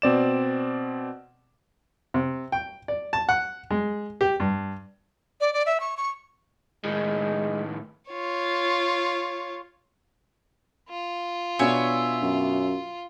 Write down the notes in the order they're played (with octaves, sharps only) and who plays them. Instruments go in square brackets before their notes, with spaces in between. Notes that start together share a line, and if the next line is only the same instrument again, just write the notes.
[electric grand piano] B2 C4 D5 E7
[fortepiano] C3
G5
D5
A5
F#5
G#3
G4
G2
[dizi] D5
D5
E5
C#6
C#6
[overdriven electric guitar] A2 D#3 [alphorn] G#3
[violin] F4 C#5
[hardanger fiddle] F4
[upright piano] B2 B3 D4 [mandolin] C#5 E5 G#5
[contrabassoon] F#2